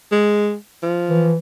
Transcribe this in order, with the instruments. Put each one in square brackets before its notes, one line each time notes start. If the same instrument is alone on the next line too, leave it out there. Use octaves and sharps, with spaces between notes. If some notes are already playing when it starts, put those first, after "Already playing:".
[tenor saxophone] G#3
F3
[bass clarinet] E3